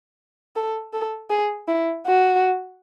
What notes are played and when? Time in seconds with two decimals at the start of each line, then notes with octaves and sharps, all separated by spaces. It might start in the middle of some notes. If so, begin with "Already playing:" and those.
0.56 A4
0.93 A4
1.30 G#4
1.68 E4
2.06 F#4